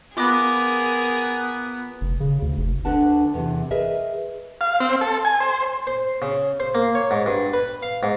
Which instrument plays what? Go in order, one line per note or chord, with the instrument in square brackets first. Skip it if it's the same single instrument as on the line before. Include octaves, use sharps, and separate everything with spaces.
[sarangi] B3 [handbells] F4 D6 A#6 [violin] G#4 A#4
[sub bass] F1
C#3
D2
F1
[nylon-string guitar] D2 D3 D4 B4 F#5 A5
E2 C3 D#3 E3
G#4 A#4 B4 D#5 E5
[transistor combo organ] F5
C4
A4
G#5
C5
[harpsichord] C5
C#3
C5
A#3
C#5
G#2
G2
B4
F5
G#2